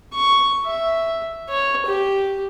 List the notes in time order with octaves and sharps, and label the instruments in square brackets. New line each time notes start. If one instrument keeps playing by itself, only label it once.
[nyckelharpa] C#6
E5
C#5
G4